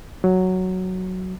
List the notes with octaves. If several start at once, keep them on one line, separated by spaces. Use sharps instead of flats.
F#3